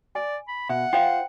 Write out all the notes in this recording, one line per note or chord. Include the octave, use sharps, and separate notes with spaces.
D5 G#5
B5
B2 E5 F#5
F4 C5 F5 G5